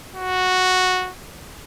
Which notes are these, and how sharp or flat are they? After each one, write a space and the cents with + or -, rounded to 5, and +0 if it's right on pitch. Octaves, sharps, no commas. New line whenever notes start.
F#4 -5